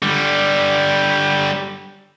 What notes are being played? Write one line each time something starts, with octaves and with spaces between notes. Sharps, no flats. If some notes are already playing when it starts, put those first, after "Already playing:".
D3 G3